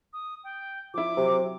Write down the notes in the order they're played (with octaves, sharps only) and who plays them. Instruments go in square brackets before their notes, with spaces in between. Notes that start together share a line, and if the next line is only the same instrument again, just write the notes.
[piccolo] D#6
G5
[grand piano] F3 E4 [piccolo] D6
[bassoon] C3 [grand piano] F#3